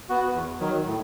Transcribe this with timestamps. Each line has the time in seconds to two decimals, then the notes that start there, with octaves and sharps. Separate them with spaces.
0.09 B3 F#4
0.34 E2
0.60 D#3 F#3
0.87 A2